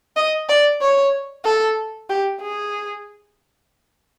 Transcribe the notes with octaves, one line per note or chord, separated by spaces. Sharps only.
D#5
D5
C#5
A4
G4
G#4